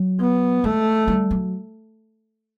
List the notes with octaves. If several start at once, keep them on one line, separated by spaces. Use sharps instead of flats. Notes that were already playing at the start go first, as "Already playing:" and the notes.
Already playing: F#3
B3
G#3 A3
G3
F#3